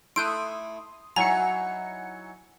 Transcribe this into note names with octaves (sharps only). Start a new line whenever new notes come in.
A3 E4 C6 D#6 F#6 G6 D7
F#3 D#4 E4 F#4 G#5 A#5 C#7